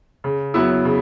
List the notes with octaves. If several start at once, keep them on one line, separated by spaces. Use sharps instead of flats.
C#3
F#3 B3 E4
C#3